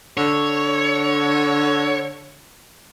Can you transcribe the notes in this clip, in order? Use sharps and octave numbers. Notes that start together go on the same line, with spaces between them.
D3 C#5